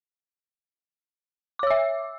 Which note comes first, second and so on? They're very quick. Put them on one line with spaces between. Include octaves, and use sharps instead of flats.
D6 C#5 E6 E5